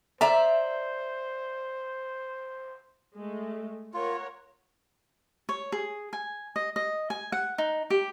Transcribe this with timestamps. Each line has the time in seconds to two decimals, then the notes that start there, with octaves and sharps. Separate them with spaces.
0.21 C5 D5 E5 A#5
3.15 G#3 A3
3.94 F4 A#4 C#5 F#5
5.49 C#5
5.72 G#4
6.13 G#5
6.56 D#5
6.76 D#5
7.10 G#5
7.32 F#5
7.58 D#4
7.90 G4